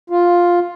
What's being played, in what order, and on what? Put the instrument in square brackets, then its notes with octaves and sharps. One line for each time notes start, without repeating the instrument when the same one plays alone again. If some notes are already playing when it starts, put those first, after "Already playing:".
[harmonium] F4